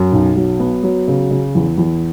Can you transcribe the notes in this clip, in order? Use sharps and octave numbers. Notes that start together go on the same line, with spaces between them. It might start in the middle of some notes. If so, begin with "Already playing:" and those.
Already playing: F#2
B1
F#3
B3
F#3
C#3
C#3
E2
E2